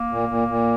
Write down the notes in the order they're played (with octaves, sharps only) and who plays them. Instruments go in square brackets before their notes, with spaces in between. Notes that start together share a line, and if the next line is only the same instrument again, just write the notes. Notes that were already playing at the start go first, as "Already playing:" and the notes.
Already playing: [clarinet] A#3
[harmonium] A#2
A#2
A#2